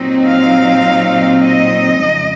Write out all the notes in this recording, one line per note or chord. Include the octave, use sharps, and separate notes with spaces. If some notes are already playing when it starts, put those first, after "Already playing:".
Already playing: A#2 F#3 C4 D#4
F5
D#5
F2 C#3 G#3